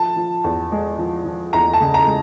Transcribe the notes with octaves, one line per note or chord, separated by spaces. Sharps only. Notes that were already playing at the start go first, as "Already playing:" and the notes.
Already playing: F3 A5
F3
E2
G#3
F3
F3
E2 A#5
A5
C#3
A#5
G#3